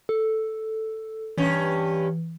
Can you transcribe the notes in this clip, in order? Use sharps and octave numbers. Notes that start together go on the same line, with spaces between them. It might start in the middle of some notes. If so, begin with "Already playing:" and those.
A4
G2 E3 C#4